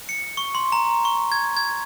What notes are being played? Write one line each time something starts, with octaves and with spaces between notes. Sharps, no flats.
C#7
C#6
C6
A#5
C#6
G#6
G#6